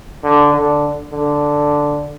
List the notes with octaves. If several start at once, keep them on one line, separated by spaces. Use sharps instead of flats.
D3
D3
D3